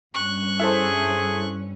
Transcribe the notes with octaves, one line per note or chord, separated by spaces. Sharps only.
G2 C#4 C#6 F#6
E4 G#4 A4 C5